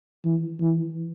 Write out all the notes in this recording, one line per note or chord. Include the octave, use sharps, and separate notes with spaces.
E3
E3